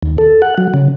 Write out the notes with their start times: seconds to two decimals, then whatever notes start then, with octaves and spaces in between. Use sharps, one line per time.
0.03 D#2
0.18 A4
0.42 F#5
0.58 F#3
0.74 C#3